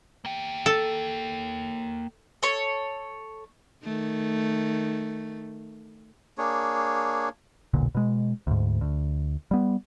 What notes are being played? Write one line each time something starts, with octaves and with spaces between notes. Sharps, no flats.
A#3 G5
A4
A4 C#5
D#3 A3
A#3 D4 G#4 C#5
E1 B1 A#2 D3
B2 G#3
D2 G#2
D2
G3 B3